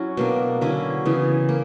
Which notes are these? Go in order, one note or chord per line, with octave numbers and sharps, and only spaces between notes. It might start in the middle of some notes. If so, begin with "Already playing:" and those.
Already playing: F#3 C#4 E4 F#4
B2 A#3 D4
D3 F#3 C#4 E4
C#3 E3 B3
A#3